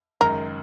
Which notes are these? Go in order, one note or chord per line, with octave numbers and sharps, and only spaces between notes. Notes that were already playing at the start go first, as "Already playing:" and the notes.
F#1 F#2 D#3 G#3 A#4